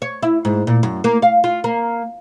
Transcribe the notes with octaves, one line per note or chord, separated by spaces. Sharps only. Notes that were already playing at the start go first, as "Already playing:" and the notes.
C#5
E4
G#2
A#2
F#2
A#3
F5
F4
A#3